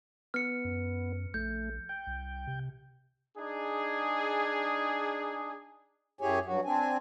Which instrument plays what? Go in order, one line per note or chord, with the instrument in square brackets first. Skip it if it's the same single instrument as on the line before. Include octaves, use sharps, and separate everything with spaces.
[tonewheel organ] B3 [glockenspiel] F6 C#7
[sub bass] F#2
[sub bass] A#1 [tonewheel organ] A3 [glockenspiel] G6
[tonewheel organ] G5
[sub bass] C2
C3
[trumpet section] D4 D#4 G#4
[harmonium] F#2 E4 G4 G#4 C#5 G#5
G2 F#3 F#4
C4 D4 G#5